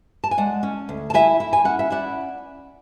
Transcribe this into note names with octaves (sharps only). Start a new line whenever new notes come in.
A5
G#5
G#3 D5 F#5
C#4
D2
A5
E4 E5 G#5
E4
G#5
C#4 F#5
E5
E4 D5 F#5